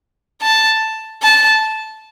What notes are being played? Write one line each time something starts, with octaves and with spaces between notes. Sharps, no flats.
A5
A5